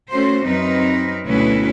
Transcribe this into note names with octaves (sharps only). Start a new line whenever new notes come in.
A3 C#4 F#4 C5
F#2 C4 D#4 A#4 B4
D2 B2 F#3 C#4 E4 B4